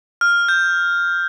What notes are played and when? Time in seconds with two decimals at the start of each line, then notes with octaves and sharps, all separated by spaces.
0.21 F6
0.49 G6